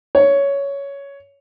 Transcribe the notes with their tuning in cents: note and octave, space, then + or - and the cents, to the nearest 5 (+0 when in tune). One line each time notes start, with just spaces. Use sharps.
C#5 +10